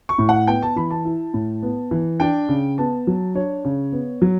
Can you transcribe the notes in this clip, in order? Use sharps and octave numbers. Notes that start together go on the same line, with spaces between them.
C#6
A2
F#5
B3 G5
A5
E3 B5
A5
E4
A2
B3
E3
D4 G5
C#3
B3 A5
F#3
D4 C#5
C#3
B3
F#3